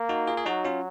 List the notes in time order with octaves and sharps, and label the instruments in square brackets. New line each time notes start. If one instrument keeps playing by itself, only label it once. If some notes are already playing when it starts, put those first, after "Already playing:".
Already playing: [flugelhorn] A#3
[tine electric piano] D#4 F#4
F4 G#4
G#4
[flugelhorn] F#3 [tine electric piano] D#4 F#4
[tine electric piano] C#4 F4